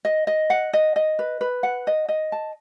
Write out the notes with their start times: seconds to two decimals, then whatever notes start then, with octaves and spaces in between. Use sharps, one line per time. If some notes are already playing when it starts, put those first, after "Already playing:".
0.05 D#5
0.27 D#5
0.50 F#5
0.73 D#5
0.96 D#5
1.19 B4
1.41 B4
1.63 F#5
1.87 D#5
2.09 D#5
2.32 A5